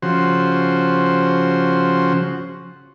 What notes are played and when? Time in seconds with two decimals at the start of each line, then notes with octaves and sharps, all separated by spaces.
0.02 C#3 F3 F#4 C5